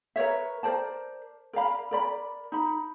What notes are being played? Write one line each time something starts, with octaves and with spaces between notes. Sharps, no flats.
A#4 B4 C#5 E5
A#4 C5 D5 A5
A#4 D5 F5 B5
A#4 D5 B5
D#4 B5